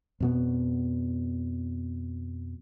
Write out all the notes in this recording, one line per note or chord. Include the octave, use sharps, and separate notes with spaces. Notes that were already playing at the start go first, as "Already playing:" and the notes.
F2 B2 B3